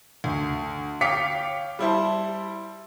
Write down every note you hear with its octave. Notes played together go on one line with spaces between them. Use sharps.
D2
C#5 F5 G5 D6 B6 C#7
G3 E4 C5 A5